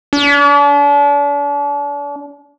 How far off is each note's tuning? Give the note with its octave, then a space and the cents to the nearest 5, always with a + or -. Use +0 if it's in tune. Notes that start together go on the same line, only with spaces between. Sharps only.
D4 -40